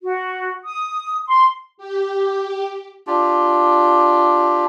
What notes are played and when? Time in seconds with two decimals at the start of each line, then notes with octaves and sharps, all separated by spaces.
0.03 F#4
0.64 D#6
1.27 C6
1.78 G4
3.07 D4 F4 G4